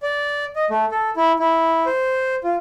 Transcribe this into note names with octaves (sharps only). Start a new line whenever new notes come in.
D5
D#5
A3
A4
E4
E4
C5
F4